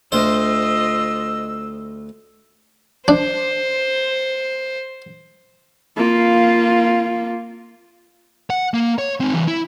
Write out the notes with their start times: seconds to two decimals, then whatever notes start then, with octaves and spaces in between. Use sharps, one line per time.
0.12 D2 F4 C5 D#5 E6
3.08 D4 C5
5.97 A#3 F4
8.50 F#5
8.74 A#3
8.98 C#5
9.20 C4 D#4
9.34 E3 G3
9.48 E4